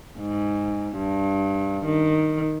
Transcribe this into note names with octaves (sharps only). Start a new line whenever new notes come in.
G#2
G2
D#3